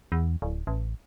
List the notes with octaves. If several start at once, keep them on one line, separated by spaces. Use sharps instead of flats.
E2
D1
A1